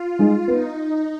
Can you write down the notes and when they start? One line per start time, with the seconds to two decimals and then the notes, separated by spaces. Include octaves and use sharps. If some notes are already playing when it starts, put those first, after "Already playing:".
Already playing: F4
0.19 G#3 D#4 G#4
0.47 B3 D#4